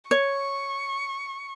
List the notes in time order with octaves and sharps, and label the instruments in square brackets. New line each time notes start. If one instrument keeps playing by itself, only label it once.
[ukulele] C#5 [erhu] C#6